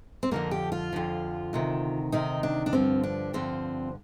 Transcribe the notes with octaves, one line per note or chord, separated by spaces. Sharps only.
C4
F2 D3 F3 A#3
G4
F4
F2 D3 F3
D2 C3 D#3
D2 C3 D#3 D#4
D4
D4
G2 D3 F3 C4
D4
G2 D3 F3 C4